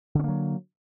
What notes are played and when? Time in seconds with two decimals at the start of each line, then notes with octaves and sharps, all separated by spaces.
0.15 D3
0.19 C#4
0.24 A#3
0.28 F#3